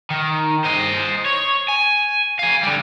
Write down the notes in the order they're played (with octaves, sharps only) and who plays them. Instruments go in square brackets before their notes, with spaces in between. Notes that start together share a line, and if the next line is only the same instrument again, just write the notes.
[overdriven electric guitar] D#3
C5 D#5
C#5
G#5
F5 G#5
D3 G3